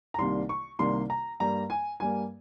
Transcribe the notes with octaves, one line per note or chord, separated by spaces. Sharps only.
A#5
C2 C3 D#3 G3 A#3 C6
C#6
C2 C3 D#3 G3 A#3 C6
A#5
G2 G3 A#3 A#5
G#5
G2 G3 A#3 G#5